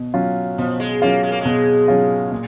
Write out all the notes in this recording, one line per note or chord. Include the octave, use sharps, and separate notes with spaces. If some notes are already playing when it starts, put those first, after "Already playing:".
Already playing: B2
F#3 C#4 F4
B2 F3
G#3
F#3 A#3 C#4 F4
G#3
A#3
B2 G#3
F#3 C#4 F4
A#2